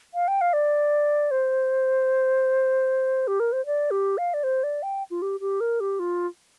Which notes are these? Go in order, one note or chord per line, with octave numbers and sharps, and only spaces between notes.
F5
G5
F5
D5
C5
G4
A#4
C5
D5
G4
F5
D5
C5
D5
G5
F4
G4
G4
A#4
G4
F4